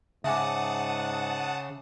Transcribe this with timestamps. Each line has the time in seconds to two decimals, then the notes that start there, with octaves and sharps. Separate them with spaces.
0.24 G#2 C#3 E5 F#5 G#5 A5 D6 D#6